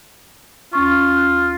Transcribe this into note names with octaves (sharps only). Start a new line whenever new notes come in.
D#2 C#4 F4 C#6
F#6